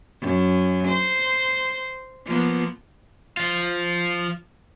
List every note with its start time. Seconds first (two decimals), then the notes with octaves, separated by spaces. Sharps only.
0.22 F#2
0.88 C5
2.26 F3 A#3 B3
3.37 F3 F4